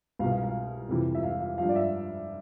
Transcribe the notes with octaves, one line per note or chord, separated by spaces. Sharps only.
C2 B2 F5
F5
F5
F2 C3 E3
E5
F5
F5
G2 F3 F5
D5
E5